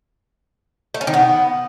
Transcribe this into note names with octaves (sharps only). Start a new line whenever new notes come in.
A3
C#4
D#3
B3